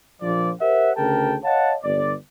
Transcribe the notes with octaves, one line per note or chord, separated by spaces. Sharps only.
A#1 F3 D5
G4 A#4 C5 E5 F#5
D2 C#3 G#4 A#4 G5 A5
C#5 D#5 F5 F#5 A5
G1 D5